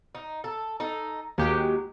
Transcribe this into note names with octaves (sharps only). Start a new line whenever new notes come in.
D#4
A4
D#4 A4
D#2 F#3 G#3 G4